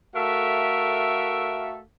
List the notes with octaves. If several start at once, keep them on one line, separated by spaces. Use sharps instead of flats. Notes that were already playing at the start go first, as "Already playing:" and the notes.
A3 F#4 A4 A#4 E5 F5